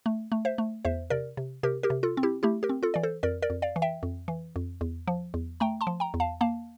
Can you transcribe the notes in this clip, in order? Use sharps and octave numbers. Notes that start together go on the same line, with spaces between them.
A3
A3
C5 E5
A3
E2 C5 E5
C3 A#4 D5
C3
C3 G4 A#4
G4 A#4
C3
F4 A4
C4
E4 G4
A3 E4 G4
G4 A#4
C4
F4 A4
E3 D5
A4 C5
F2 A#4 D5
A#4 D5
F2
D5 F5
E3
E5 G5
F2
E3
F2
E2
F3
E2
A3 G5 A#5
A5 C6
F3
G5 A#5
E2
F5 A5
A#3 F5 A5